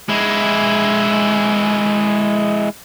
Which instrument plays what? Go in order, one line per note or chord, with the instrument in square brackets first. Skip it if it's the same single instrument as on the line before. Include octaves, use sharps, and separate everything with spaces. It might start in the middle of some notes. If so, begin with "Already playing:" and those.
[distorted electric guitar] G#3 E4